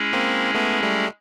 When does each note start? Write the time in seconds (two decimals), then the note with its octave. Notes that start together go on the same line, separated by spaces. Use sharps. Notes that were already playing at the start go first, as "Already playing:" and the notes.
Already playing: G#3 C#4 E4 G#4
0.13 A#3 C4
0.55 A3 B3
0.83 G3 A3